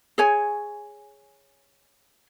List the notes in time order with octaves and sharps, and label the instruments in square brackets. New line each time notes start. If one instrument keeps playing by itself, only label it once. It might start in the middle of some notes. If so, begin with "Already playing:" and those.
[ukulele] G#4 C#5 G#5